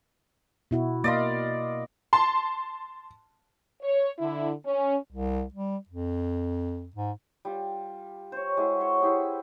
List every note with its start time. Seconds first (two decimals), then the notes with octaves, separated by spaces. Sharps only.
0.71 B2 E4 F#4
1.04 A#3 D5 D#5 F5 C6
2.13 A5 C6
3.83 C#5
4.19 D3 E4
4.65 C#4
5.11 C2
5.54 G3
5.89 F2
6.96 G#2
7.45 G3 F4
8.32 C5 C#5
8.57 G#3 E4 F#4
8.80 C#5 C6
9.00 E4 G4 G#4 C5